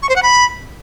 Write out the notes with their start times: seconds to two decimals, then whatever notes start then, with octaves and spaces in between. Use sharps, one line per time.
0.03 C#6
0.09 C5
0.16 F#5
0.23 B5